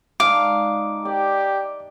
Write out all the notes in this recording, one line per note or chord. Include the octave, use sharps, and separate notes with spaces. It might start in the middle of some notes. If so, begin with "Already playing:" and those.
G#3 D4 D#4 F5 D6
G4 D5 G5